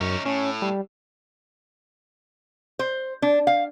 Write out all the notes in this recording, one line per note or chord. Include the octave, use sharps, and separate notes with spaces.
F#2 C#4 D#4
A2 C#4
G3
C5
D4
F5